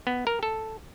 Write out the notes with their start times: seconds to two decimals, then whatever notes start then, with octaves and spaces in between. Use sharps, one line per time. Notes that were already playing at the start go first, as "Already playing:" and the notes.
0.07 B3
0.27 A#4
0.43 A4